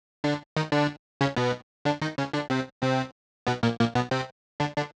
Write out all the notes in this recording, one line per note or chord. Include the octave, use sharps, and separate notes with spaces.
D3 D4
D#3 D#4
D3 D4
C#3 C#4
B2 B3
D3 D4
D#3 D#4
C#3 C#4
D3 D4
C3 C4
C3 C4
B2 B3
A#2 A#3
A#2 A#3
B2 B3
C3 C4
D3 D4
D3 D4